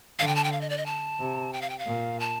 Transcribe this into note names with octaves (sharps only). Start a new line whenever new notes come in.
D3 F5
G5
A5
G5
F5
D#5
D5
D#5
A5
C3
G5
F5
G5
F5
A#2
A5